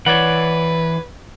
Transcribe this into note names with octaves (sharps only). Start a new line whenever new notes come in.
E3 B4 C#5 D5 F#5